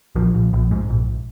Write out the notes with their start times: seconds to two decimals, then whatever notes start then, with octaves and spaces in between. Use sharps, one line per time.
0.16 A#1 F3
0.35 A#1
0.53 A#1
0.71 G#2
0.90 A#1